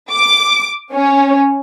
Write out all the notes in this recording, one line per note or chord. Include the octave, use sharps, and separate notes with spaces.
D6
C#4